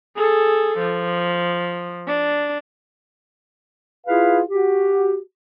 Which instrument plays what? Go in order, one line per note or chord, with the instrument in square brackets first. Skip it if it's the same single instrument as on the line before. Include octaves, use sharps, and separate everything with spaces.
[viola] G#4 A4
F3
D4
[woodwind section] E4 F4 G#4 B4 F5
F#4 G4